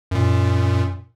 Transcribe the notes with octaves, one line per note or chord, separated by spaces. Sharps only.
F#2 A#2